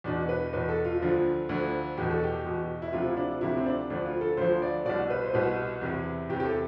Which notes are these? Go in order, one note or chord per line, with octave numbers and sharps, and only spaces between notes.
E2 B2 D4
B4
E2 B2 B4
A4
F4
D2 D3 F3 F4
D2 D3 F3
E2 B2 G4
A4
G4
E2 B2
E4
D2 C3 F3 F4
E4
D4
F4
D2 C3 F3 E4
C4
D4
D2 D3 F3 D4
F4
A4
D2 D3 F3 C5
D5
C2 B2 D5
B4
C5
C2 B2 B4
E2 C3 E3
E2 C3 E3 G4
G4
A4